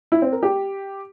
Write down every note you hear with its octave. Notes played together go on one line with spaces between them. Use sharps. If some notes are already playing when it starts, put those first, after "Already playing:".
E4
C4
A#4
G4